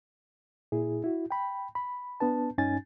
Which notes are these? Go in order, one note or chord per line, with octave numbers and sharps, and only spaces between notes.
A#2 E4 G#4
E4 F#4
G5 B5
B5
B3 D4 B4 A5
G2 C#4 D#4 G#5 A6